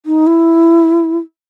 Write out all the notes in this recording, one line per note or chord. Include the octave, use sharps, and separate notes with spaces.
D#4
E4